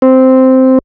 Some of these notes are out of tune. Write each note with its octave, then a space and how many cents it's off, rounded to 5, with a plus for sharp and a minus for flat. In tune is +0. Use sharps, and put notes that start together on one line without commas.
C4 -5